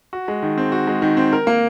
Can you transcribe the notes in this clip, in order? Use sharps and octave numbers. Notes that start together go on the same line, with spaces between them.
F#4
G#3
D#3
C4
F#4
G#3
D#3
C4
A#4
A#3